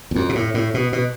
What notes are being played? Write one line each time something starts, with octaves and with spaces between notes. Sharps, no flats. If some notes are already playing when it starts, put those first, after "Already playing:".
E2
F2
B2
A2
A2
B2
B2